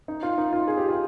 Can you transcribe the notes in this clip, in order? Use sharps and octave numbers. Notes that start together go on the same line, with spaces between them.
D#4
F4
D#4
F4
G#4
G4
F4